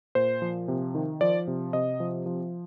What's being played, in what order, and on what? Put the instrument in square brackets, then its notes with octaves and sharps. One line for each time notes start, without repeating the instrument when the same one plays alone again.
[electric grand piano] A#2 C5
F3
C3
D#3
F3 D5
C3
C3 D#5
F3
F3